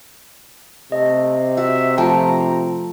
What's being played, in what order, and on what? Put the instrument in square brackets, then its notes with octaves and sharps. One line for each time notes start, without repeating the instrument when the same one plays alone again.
[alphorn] C3 [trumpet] A3 [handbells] D#5
[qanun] F#4 [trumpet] E5
[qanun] F3 A3 [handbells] G5 [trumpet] A#5